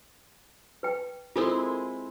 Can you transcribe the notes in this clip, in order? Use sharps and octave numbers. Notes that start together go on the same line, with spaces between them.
B4 G5
G#3 C4 E4 F4 A4 A#4